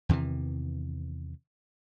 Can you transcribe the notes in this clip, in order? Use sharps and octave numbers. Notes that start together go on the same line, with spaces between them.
E2 C3 D#3 E3